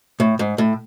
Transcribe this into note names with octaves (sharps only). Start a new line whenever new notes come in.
A2
G#2
A2